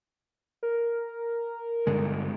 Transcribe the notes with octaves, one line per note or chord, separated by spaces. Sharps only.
A#4
G2 D3 G#3